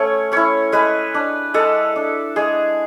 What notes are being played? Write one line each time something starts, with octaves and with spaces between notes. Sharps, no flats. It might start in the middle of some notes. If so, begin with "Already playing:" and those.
Already playing: A3 C#4 C#5
C#4 E4 C#5
G#3 B4
D4
G#3 A4
D4
G#3 G#4